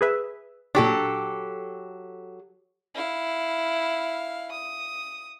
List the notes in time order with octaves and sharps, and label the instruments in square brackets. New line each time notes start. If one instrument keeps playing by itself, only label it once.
[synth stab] G#4 B4 E5
[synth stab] A#2 D4 [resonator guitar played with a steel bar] F#3 G4 A4
[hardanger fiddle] E4 F5
D#6